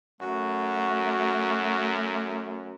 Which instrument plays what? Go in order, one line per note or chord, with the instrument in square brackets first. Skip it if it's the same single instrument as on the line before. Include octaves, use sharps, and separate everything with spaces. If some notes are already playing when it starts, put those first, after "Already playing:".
[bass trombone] F#2 [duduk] A3 [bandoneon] F#4